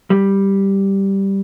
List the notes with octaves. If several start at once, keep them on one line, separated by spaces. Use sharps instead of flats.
G3